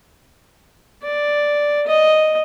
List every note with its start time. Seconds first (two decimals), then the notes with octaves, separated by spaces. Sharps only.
1.03 D5
1.87 D#5